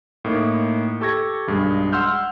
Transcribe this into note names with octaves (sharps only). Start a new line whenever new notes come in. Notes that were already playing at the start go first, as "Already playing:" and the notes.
A2 A#3 D#4
G4 A4 C#6 G#6 A#6
B1 G2 G#3
F#5 C6 E6 F6 G6